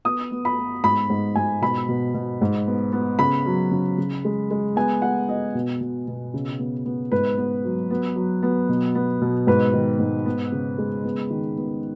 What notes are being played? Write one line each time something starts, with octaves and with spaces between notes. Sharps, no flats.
B3 D#6
B3
B5
B3
G#2 B5
G#2
G#2 G#5
B2 B5
B2
B2
G#2
B3
B3
C#3 B5
F#3
C#3
C#3
G#3
G#3
B3 G#5
B3 F#5
B3 D#5
B2
B2
B2
C#3
B3
B3
G#2 B4
B3
F#3
B3
F#3
B3
B2
B3
B2
G#2 B4
D#3
G#2
B3
C#3
G#3
B3
D#3
B3